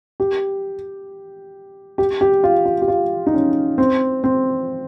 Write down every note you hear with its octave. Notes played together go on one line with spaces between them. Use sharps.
G4
G4
G4
F4
F4
G4
F4
D#4
C#4
C4
C4